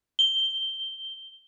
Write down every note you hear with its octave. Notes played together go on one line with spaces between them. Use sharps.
G7